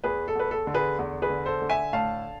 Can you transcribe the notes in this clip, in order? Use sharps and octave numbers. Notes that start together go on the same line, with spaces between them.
E2 G#4 B4
A4
E2 B4
A4
D3
G#4 B4
E2
G#4 B4
D3
A4 C5
D3
E5 G#5
A2 F5 A5